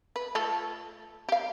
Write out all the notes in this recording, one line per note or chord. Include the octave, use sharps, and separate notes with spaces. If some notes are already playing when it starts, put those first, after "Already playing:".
B4
A3 F4 A4
G4 F5